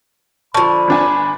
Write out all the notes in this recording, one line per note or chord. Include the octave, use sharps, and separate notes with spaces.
D3 F3 A5 B5 C#6
G1 D4 G#5